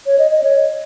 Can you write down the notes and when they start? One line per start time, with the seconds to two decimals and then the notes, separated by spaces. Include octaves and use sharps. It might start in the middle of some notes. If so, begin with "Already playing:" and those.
0.06 C#5
0.19 D#5
0.31 D#5
0.43 C#5